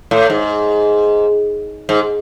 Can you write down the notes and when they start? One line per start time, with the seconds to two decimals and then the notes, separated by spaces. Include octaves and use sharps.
0.11 A2
0.30 G#2
1.89 G#2